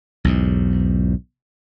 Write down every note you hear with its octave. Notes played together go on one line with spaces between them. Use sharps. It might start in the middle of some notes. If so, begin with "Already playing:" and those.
B1 E2 G#2